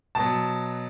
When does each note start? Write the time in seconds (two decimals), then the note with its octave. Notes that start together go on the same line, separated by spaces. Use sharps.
0.15 B2 F#3 A5